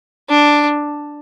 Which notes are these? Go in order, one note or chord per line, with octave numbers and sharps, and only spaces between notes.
D4